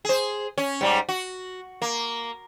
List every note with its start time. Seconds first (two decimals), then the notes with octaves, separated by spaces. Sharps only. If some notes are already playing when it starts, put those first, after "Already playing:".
0.05 G#4 C5
0.58 C#4
0.81 G#2 G3
1.09 F#4
1.82 A#3